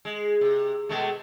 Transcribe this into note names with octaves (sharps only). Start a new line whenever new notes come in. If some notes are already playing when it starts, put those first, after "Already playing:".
G#3
C3
B2 G#3 A3